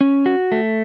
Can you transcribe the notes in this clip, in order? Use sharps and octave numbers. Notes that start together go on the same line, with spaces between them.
C#4
F#4
A3